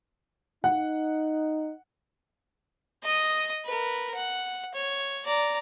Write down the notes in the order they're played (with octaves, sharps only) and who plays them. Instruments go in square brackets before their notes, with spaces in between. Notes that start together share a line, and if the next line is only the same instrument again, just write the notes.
[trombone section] D#4 [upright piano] F#5
[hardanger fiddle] D#5 D#6
A#4 B4
F#5
C#5
D5 A#5